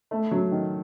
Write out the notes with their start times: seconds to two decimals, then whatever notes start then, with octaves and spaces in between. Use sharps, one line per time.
0.11 A3
0.31 F#3
0.52 D#3